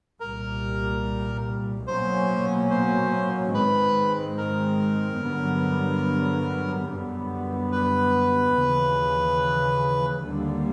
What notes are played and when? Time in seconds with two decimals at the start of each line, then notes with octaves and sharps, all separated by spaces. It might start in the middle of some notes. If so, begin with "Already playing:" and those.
0.20 C2 A#2 G3 A#4
1.87 B2 F#3 A#3 C#4 C5
2.71 C5
3.54 G#2 D#3 G#3 C4 B4
4.38 A#4
5.21 G2 D3 F#3 B3
6.88 F#2 D3 G3 B3
7.72 B4
8.56 D#2 C#3 E3
10.23 D#2 D3 G3 A#3